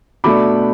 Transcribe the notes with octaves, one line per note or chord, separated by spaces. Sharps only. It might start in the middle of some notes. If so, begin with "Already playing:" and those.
B2 A3 D4 B5 D6